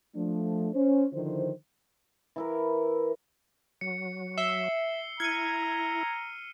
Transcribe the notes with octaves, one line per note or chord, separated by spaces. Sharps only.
F3 A3 D4
C#4 C5
D3 D#3 F3 E4 C5
E3 E4 A#4
F#3 C#7
E5 E6 C7 G7
E4 A#5 F6 G#6 C#7 D#7